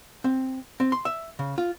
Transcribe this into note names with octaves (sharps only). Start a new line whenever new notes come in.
C4
C4
C6
E5
C#3
F4